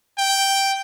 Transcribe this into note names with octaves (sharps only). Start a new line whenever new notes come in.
G5